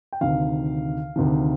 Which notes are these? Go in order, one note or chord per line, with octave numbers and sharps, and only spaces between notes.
G5
D2 C3 D#3 F5
D2 C3 D#3